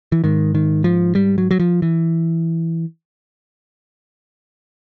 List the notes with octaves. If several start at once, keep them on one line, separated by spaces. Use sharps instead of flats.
E3
G#2 D#3
D#3
F3
G3
F#3
F#3
F3
E3